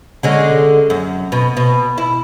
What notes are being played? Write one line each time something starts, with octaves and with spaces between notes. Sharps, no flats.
D3 G#3 C#4
F#2
B2
B2
E4